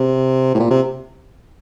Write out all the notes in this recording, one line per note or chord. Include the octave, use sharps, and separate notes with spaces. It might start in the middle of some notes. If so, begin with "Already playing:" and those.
Already playing: C3
A2
A#2
C3